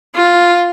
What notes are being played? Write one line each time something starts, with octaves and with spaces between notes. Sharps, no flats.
F4